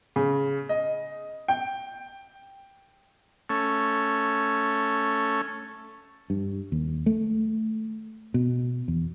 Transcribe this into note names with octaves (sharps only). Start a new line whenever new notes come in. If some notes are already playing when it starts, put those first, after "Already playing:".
C#3
D#5
G5
A3 C#4
G2
D#2
A3
B2
E2